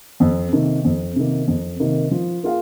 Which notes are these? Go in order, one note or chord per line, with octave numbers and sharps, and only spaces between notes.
F2
C3 D#3 A#3
F2
C3 D#3 A#3
F2
C3 D#3 A#3
F3
A#3 F4 G#4 F5